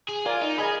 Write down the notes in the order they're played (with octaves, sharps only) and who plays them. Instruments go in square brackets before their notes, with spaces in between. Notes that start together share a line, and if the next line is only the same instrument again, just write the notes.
[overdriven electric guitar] G#4
[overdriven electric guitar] F4 [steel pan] A#4 D5 G#5
[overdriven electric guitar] D#4
[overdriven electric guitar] G#4 [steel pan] A#4 D#5 G#5 B5